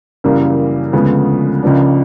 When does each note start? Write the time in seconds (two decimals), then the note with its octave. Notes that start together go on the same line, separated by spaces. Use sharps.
0.24 F#2 C#3 E3 G3 A#3
0.93 D2 C#3 F3 G#3 B3
1.63 C#2 C#3 F3 A#3 D4